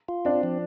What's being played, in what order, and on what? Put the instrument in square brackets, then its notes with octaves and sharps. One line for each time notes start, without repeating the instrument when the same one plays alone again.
[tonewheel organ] F4
[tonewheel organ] C4 [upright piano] D4
[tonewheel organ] F3